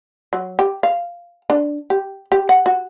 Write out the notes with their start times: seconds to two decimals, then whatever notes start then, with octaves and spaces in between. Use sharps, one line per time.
0.33 F#3
0.59 G4
0.83 F5
1.50 D4
1.90 G4
2.32 G4
2.49 F#5
2.66 F#4